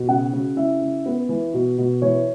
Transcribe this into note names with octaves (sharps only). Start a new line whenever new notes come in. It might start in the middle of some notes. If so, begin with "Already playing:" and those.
Already playing: B2
C#3 F#4 F#5
C#3
C#3 E4 E5
C#3
B3 B4
E3
B2
B2
E3 C#5